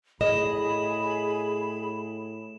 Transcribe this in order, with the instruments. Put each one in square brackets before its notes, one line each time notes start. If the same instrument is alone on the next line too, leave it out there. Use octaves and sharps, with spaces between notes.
[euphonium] A2 [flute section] G#4 B5 [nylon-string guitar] D#5 [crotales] E7